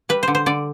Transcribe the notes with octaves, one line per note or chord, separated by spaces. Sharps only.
G3 B4
D3 C5
C5
D3 D5